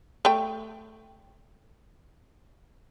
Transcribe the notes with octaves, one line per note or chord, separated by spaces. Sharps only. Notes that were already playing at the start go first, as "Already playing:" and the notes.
A3 G5